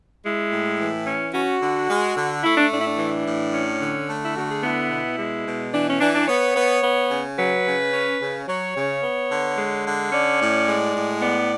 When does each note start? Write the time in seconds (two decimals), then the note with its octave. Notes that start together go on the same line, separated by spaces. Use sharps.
0.25 G#3 E4
0.52 A2
0.79 E3
1.07 C#4
1.34 C#4 F#4
1.61 D3
1.90 G#3
2.17 D3
2.44 A3 E4
2.58 D4
2.71 A2 D4
2.79 E4
2.85 D4
2.99 E3
3.26 A2
3.54 C#4
3.81 D3
4.09 A3
4.22 E4
4.36 D3 F#4
4.50 G#4
4.63 B3 E4
4.91 B2
5.18 G#3
5.46 B2
5.73 E3 D4
5.87 C#4
6.01 E3 D4
6.15 D4
6.28 B3 C#5
6.56 B3
6.83 B3
7.11 C#3
7.38 F#3 B4
7.66 C#3
7.93 C#4
8.21 C#3
8.48 F#3 C#5
8.75 C#3
9.03 B3
9.31 D3
9.58 G#3
9.85 D3
10.12 C#4 D5
10.41 A2
10.67 G#3
10.95 A2
11.22 B3 D5